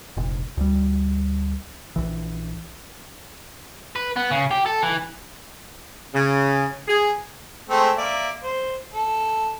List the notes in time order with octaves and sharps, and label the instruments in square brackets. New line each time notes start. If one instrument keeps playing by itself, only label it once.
[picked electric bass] F1 A#1
D2 G3
A#1 E3
[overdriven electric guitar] B4
B3
C#3
G4
A4
E3
[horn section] C#3
G#4
[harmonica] G#3 A3 C4
A#3 D5 E5
C5
A4